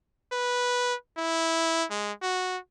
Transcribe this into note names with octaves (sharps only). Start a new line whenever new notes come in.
B4
E4
G#3
F#4